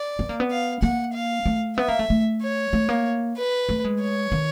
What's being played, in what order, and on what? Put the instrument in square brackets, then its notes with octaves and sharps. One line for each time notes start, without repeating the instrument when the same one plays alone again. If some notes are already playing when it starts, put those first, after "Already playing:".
Already playing: [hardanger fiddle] D5
[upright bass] B3
A#3
B3
[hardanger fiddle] F5
[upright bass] A#3 [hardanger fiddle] F#5
[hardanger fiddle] F5
[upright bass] A3
[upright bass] B3 [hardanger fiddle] E5
[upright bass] A#3
A3
A3
[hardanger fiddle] C#5
[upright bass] A3
A#3
[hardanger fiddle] B4
[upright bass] A3
G#3
[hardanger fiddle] C#5
[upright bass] D#3